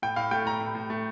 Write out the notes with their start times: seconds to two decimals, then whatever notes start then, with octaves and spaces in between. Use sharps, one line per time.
0.02 A2 G5
0.16 A2 F5
0.31 A3 G5
0.46 A2 A#5
0.60 A2
0.75 A2
0.90 A3